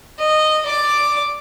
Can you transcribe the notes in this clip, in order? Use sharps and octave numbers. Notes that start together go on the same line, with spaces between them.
D#5
D5 D6